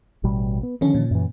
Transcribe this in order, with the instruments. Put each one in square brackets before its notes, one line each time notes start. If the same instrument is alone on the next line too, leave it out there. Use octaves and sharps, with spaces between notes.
[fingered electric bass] A1 B2 G3
B3
[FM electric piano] D3 C#4 [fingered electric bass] D#3 F3
[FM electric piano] A#2
[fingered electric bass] F#2 E3